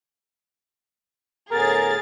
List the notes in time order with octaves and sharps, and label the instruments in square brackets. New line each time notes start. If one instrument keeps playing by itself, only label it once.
[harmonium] A2 D3 B3 [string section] G#4 A6 [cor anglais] A#4